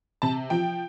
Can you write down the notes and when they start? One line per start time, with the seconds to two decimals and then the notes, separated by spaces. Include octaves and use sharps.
0.22 C3 A5
0.50 F3 G5